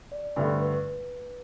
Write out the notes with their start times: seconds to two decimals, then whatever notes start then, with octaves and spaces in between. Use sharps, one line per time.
0.12 D5
0.36 G2 D3 A3 D5
0.49 C5
0.61 B4
0.73 B4